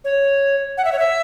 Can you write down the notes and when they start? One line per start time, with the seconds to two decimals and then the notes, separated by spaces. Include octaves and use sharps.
0.04 C#5
0.77 F#5
0.85 E5
0.92 C#5
0.99 E5